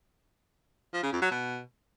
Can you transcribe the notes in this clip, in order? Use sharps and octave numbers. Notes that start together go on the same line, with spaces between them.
F3
C#3
F2
F#3
B2